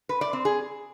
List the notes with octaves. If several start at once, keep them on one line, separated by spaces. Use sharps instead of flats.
B4
D5
C4
G#4